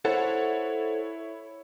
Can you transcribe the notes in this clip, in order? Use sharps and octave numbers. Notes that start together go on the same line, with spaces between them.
E4 A4 C5 C#5 F#5